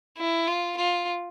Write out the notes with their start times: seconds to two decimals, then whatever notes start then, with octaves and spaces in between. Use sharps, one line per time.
0.17 E4
0.47 F4
0.77 F4